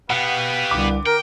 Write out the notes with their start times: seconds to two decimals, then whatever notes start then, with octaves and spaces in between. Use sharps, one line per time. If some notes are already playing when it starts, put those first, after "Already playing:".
0.10 B2 B3 G4 B4 F5 F#5
0.71 C2 D3 D6
1.06 A#4 G5